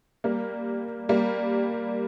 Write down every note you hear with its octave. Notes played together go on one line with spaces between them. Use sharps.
G3 A#3
G3 A#3